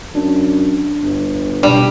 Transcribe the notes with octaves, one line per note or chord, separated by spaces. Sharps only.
F#2 D4
G1
B2 G3 D4